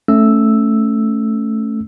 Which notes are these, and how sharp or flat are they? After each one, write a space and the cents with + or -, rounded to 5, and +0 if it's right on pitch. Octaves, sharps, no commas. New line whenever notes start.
A3 +0 C#4 +0 E6 +0